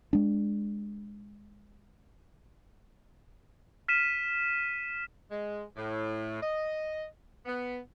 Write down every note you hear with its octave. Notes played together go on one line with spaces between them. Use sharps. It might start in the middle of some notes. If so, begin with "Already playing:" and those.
G#3 D4
F6 B6 D#7 E7
G#3
A2
D#5
B3